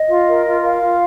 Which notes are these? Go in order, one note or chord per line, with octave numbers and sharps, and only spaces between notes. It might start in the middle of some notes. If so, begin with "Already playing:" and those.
Already playing: D#5
F4
A#4
F4
A#4 F5
F4